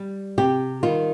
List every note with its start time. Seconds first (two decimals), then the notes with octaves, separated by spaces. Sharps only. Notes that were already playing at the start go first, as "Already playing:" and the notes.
Already playing: G3
0.38 C3 G4
0.83 D#3 G3 F4